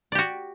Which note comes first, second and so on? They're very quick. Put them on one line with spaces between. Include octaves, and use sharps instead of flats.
D5 G4 F#4